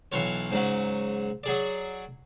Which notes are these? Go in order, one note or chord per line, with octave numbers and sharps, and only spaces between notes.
B1 E3 F4 C#5
G#2 C#3 F#3
F#3 G#4 D5